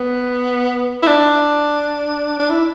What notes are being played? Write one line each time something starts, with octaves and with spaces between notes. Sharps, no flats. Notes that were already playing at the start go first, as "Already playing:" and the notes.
Already playing: B3
E4
D4
D4
E4